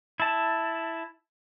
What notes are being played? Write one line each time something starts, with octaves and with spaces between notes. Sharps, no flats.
E4 A5